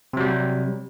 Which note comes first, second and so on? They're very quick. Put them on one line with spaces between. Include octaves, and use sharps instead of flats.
C3 F#3 G3